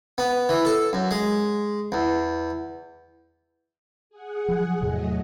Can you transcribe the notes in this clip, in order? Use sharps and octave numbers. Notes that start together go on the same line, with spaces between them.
B3
E3
A4
F#2
G#3
E2
G#4 F#5
F3 F#3
E2 A2 C3 F#3 A3 D#5